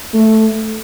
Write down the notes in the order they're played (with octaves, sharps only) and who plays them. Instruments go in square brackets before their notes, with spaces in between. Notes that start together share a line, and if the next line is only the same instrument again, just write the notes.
[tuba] A3